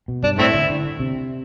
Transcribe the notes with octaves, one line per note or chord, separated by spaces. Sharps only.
B2
G2 D4
A2 A3 C4 E4
D3
D3
C3